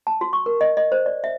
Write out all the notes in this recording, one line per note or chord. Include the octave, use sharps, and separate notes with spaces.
A5
F#4
C#6
A#4
D#5
D#5
C5
D5
E5